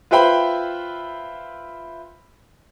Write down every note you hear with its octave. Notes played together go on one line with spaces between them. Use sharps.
F4 B4 C5 E5 G5 B5